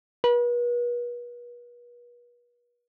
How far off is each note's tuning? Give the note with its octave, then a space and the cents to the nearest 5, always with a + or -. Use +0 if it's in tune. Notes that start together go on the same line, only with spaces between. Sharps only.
B4 -40